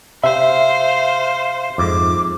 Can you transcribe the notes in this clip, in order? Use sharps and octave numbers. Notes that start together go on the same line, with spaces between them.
C3 C5 E5 F5
F2 G#2 D6